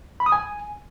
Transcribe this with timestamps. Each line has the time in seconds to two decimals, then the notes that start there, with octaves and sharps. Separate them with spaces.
0.20 B5
0.26 D#6
0.32 G#5